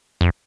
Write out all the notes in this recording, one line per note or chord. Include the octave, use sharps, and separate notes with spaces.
F2